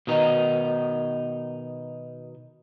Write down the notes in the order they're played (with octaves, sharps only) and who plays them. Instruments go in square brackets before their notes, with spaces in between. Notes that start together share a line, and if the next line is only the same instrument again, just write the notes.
[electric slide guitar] B2 D#3 D#4